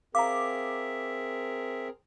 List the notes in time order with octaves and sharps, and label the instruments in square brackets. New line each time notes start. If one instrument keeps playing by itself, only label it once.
[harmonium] C4 G#4 A#4 [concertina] E5 [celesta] F5 A#5 [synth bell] D6